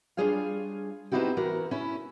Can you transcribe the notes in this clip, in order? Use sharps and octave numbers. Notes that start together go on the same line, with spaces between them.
G3 D4 F4 G#4 C#5 F5
B3 C4 D#4 E4 F#4 G4
E3 F#4 A#4
C#4 E4